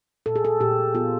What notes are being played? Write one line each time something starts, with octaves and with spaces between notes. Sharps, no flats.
A#2 A4
G#4
A4
A#2 G4
B3 F4